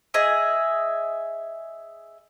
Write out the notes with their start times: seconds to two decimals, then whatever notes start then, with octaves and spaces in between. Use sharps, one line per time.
0.14 G#4 D#5 E5